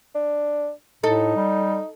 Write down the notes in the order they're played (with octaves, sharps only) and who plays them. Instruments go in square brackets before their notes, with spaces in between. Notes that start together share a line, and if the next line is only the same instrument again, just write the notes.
[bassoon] D4
[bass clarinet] A2 [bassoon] D#4 [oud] A4
[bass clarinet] G3